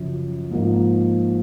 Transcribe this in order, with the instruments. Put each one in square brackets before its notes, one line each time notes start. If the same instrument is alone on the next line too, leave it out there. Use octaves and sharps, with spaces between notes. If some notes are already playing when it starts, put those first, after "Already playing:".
Already playing: [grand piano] F#2 C#3 F3
G#2 F3 A#3 D#4